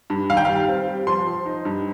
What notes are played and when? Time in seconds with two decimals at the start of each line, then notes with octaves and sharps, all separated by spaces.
0.10 G2
0.30 D#3 F5
0.37 G5
0.45 G3 F5
0.68 C4
0.88 G3
1.07 F3 C6
1.27 F3
1.46 D#4
1.65 G2